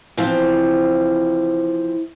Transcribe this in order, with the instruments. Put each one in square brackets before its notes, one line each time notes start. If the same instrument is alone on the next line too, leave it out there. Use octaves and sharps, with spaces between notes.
[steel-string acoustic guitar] E3 F3 C4